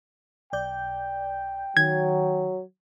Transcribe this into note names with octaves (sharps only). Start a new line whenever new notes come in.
B1 D5 G5 G6
D#3 F#3 G#6